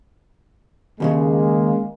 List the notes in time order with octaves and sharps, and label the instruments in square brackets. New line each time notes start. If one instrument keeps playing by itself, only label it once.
[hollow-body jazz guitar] D#2 A#2 C#3 [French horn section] G#3 A#3